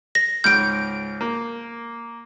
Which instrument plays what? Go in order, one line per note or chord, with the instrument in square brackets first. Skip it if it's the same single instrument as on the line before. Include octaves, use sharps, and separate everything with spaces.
[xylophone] A#6
[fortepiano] C#2 G#2 F6 [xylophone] G6 D7
[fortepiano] A#3